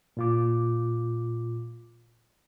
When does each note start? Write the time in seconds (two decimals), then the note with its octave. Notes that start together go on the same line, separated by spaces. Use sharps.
0.17 A#2 F4 D6